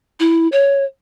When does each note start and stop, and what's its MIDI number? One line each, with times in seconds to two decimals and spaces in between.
0.20 0.48 64
0.52 0.84 73